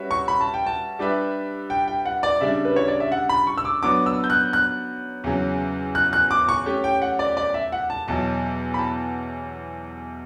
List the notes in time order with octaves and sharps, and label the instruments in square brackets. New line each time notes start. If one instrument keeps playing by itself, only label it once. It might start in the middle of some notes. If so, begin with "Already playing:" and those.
Already playing: [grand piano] G3 C#4 F#4 B4 E5
[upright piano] C#6
B5
A5
G5
A5
[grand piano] G3 D4 G4 B4 E5
[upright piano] G5
G5
F#5
D5
[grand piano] C#3 G3 D4 [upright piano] E5
[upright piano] B4
C#5
D5
E5
F#5
B5
C#6
E6
D6
[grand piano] F#3 B3 D4 [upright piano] D6
[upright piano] E6
G6
F#6
F#6
[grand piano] E2 C#3 F#3
[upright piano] F#6
F#6
D6
C#6
[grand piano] A3 C#4 G4
[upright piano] G5
F#5
D5
D5
E5
F#5
A5
[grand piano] E2 B2 F#3 [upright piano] A5
[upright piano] B5
A5